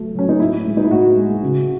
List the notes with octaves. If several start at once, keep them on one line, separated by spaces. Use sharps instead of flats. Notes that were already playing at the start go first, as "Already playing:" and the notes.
Already playing: F#3 A3
F#3 C#4
D#4
A2 E4
G#3
D#4
E4
A2 F#4
G#3
C#3